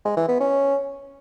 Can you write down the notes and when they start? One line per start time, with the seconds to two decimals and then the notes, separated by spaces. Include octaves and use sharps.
0.05 G#3
0.17 E3
0.28 B3
0.40 C#4